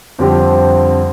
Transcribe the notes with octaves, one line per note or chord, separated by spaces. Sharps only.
F2 D3 G3 C4 G4